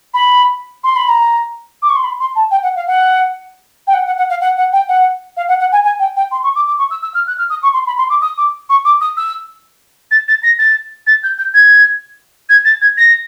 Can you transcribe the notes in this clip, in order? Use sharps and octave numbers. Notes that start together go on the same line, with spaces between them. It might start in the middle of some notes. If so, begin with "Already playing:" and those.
B5
C6
B5
A#5
D6
C#6
C6
B5
C6
A5
G5
F#5
F5
F#5
G5
F#5
F#5
F#5
F5
F#5
F#5
G5
F#5
F5
F#5
F#5
G#5
G#5
G5
G5
C6
C#6
D6
D6
C#6
E6
E6
F6
F#6
F6
D#6
C#6
C6
B5
C6
D6
D#6
D6
C#6
D6
D#6
E6
A6
A6
A#6
A6
A6
G6
G6
G#6
G#6
A6
G#6
A#6